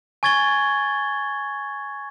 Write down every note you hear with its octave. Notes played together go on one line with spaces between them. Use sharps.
G#5 C#6 G#6 A6 G7